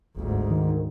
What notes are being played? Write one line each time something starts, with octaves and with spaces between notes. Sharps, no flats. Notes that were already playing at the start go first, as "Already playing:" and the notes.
G1 D2 G#2
D#3